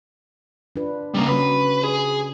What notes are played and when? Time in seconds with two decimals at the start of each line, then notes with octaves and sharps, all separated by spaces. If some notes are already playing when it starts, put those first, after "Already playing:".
0.76 D4 F4 B4
1.14 C#3 G3 A#3 C#4
1.28 C#3 F#4 B4
1.84 G#4